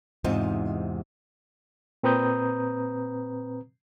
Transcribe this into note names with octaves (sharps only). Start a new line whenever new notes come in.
E2 G#2 C3 C4 D#4 F4
A#2 C4 B4 A#5 D#6 G6